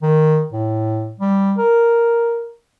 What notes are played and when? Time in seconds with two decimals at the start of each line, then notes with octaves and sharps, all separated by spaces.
0.02 D#3
0.52 A2
1.20 G3
1.58 A#4